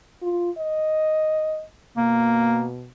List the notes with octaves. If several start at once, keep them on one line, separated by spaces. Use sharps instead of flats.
F4
D#5
B2 A#3